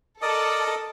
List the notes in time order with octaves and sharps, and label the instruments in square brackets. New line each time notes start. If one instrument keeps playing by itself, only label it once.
[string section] A4 [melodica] A#4 D#5 D#6 [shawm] D5